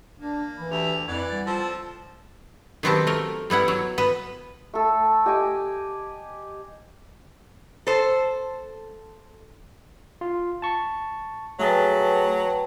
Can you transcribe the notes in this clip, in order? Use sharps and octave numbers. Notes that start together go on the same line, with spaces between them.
A#3 D4
E3 B5
D2 G4 E5 F7
F2 E3 D5 F#5 G#6
G3 A6
F3 C4 A4 E6
D#3 F#3 B3 C4 G4 A5
A3 A#4
G3 B3 E4 F#5
F#3
B3 B4
A3 A4
G4 D#5 G#5 D6
A4 C5
F4
A5 C#6
F#3 A3 G#4 B4 G5 A5 A6